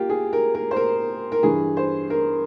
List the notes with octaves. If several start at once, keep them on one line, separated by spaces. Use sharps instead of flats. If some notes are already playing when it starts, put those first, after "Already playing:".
Already playing: A#3 F4 G4
G#4
A#4
A#4
C5
A#4
A#4
G2 E3 G#4
C5
A#4